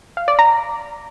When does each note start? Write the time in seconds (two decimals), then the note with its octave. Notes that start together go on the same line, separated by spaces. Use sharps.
0.17 F5
0.28 D5
0.39 A#5